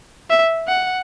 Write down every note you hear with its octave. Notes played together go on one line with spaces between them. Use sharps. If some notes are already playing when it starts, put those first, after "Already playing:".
E5
F#5